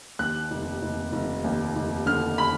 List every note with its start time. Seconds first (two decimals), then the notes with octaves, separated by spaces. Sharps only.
0.19 D#2 F#6
0.51 F1
0.82 F1
1.13 F1
1.44 D#2
1.76 F1
2.06 D3 F6
2.38 B5